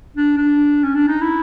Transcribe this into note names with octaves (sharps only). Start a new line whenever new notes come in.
D4
D4
C#4
D4
D#4
E4